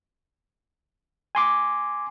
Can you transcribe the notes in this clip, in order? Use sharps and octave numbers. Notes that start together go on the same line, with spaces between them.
G#5 C6 D6